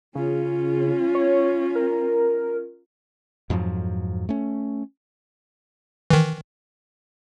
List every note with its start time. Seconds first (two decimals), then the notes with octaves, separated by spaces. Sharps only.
0.15 C#3 C#4 F4
1.15 C#5
1.75 A#4
3.50 F2 G#2 F3 F#3
4.29 A3 C#4
6.10 D#3 E3